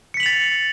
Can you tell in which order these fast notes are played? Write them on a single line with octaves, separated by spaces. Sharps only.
C#7 B6 F#7 F7 A6